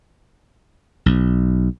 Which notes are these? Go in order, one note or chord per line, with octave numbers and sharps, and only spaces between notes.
B1